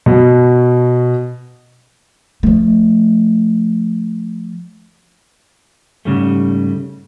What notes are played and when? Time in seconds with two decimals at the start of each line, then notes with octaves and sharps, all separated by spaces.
0.06 B2
2.43 F3 A3
6.05 G#2 C#3 G3 A3